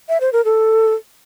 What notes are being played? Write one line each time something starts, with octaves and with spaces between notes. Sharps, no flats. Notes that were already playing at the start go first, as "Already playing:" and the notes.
E5
C5
A#4
A4